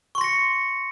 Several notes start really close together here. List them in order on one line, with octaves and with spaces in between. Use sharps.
C#6 C6 A#6 C#7